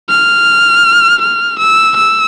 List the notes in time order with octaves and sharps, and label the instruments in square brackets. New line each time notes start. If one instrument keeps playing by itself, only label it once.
[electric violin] F6
F6
E6
E6